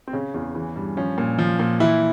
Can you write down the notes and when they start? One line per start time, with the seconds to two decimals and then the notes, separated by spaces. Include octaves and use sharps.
0.07 C4
0.13 C#3 C#4
0.34 E2
0.55 E3
0.76 G2
0.97 F3 C#4
1.18 A#2
1.39 F3
1.59 A#2
1.80 E3 E4